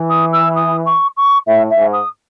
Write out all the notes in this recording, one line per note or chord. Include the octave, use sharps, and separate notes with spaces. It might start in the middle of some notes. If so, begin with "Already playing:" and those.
Already playing: E3
D#6
E6
D#6
C#6
C#6
A2 E5
E5
G#2
D#6